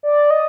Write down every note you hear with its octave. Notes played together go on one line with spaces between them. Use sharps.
D5
D#5